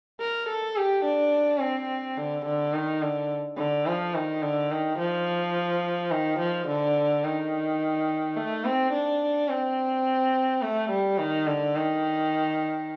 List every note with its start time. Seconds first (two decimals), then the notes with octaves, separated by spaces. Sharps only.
0.20 A#4
0.49 A4
0.76 G4
1.05 D4
1.61 C4
2.17 D3
2.45 D3
2.74 D#3
3.02 D3
3.58 D3
3.86 F3
4.15 D#3
4.43 D3
4.71 D#3
4.98 F3
6.12 D#3
6.39 F3
6.68 D3
7.24 D#3
8.37 A3
8.65 C4
8.93 D4
9.49 C4
10.62 A3
10.91 G3
11.18 D#3
11.47 D3
11.75 D#3